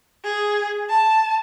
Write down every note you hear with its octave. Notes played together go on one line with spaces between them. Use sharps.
G#4
A5